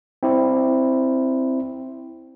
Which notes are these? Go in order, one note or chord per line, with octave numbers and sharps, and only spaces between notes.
C4 E4 C5